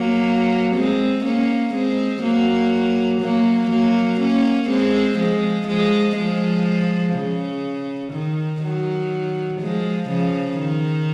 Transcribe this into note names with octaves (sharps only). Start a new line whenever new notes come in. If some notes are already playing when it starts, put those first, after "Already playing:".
Already playing: F#3 A#3
G#3 C4
A#3 C#4
G#3 C4
F#3 A#3
F#3 A#3
F#3 A#3
A#3 C#4
G#3 C4
F3 G#3
F3 G#3
F3 G#3
C#3
D#3
D#3 F#3
F3 G#3
C#3 F3
D#3